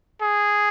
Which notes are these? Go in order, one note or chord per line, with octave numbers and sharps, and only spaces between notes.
G#4